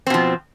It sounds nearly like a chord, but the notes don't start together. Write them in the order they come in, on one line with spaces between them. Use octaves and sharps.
C4 B2 F3